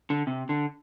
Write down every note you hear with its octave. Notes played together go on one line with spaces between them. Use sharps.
D3
C3
D3